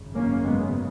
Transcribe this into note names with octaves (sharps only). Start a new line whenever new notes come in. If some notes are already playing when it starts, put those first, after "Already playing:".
Already playing: G#1 F#2 C#3
A#3 C#4
G#3 B3